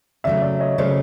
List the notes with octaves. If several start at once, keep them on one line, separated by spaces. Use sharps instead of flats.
C#3 F#3 A3 D5 E5
D5 E5
C#5 D#5
C#3 F#3 A3 C5 D5